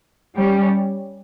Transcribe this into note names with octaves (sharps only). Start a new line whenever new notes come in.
G3 C#4